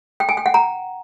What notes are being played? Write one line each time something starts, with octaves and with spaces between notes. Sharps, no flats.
G5
G#5
G5
F#5
A#5